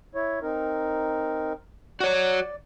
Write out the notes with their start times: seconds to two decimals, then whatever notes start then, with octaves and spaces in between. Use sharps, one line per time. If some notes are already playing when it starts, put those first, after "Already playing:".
0.15 E4 C#5
0.42 C4 D#4 A#4
2.00 F#4 C#5 D5